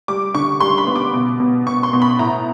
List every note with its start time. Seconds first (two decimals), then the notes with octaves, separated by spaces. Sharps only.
0.08 G3 D6
0.34 D3 C#6
0.60 G3 C6
0.78 B5
0.87 B3
0.96 D6
1.13 B2
1.40 B2
1.66 B2 C#6
1.83 C6
1.93 B2
2.02 B5
2.19 A2 A#5